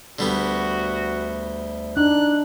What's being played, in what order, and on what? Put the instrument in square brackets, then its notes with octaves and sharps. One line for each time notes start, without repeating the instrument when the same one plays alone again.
[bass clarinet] D2 [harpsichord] D3 G3 B3 [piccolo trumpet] F#4
[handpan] D4 [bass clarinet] D#4 [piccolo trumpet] F#6